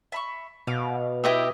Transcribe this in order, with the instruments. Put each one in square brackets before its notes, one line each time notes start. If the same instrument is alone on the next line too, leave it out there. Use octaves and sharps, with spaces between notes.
[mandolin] E5 B5 C#6
[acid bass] B2 [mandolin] F5 D6
[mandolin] E4 B4 G5 [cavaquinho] G4 D#5 E5